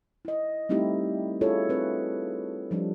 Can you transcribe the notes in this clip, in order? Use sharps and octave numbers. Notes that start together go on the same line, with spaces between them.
E4 D#5
G3 A3 C4 D#4 E4 G4
D4 E4 F4 G#4 A4 C#5
C4 B4
F3 G3 D4